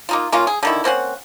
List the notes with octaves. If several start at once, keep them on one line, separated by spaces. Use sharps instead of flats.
A#3 D#4 F4
A#3 C#4 F4
G#4
D3 D#3 E4
A#3 C4 C#4 F#5